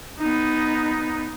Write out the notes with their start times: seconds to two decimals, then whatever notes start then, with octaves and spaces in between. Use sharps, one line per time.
0.19 B3 D#4